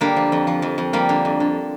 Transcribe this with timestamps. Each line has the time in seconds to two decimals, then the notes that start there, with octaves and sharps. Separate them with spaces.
0.01 D3 G3 A#3
0.16 F3
0.32 F2
0.47 F3
0.62 F2
0.78 F2
0.93 F3 G3 A#3
1.09 D3
1.25 F2
1.40 D3